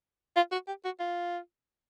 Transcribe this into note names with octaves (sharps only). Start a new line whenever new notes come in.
F4
F#4
G4
F#4
F4